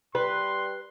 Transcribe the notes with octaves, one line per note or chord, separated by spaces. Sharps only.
G3 B4 C6